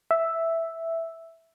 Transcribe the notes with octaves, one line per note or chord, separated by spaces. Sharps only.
E5